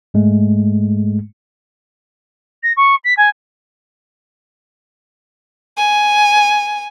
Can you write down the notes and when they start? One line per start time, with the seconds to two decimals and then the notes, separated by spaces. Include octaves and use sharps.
0.14 G#2 G#3 A3
2.63 A#6
2.77 C#6
3.04 B6
3.17 G#5
5.77 G#5